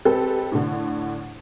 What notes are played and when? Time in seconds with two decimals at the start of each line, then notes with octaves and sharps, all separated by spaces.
0.05 G#3 C4 G4 A4 B4
0.52 A2 D3